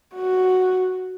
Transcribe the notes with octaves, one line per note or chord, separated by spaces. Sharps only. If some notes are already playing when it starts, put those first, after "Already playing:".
F#4